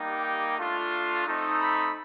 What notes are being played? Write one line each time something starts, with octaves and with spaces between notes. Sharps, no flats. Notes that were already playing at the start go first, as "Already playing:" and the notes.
Already playing: G3 A#3 D#4 G4
G5
A3 D4 F4
A3 C4 D#4
B5